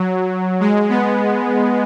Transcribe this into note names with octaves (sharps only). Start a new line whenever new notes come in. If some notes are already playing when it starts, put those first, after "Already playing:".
Already playing: F#3
G#3
B3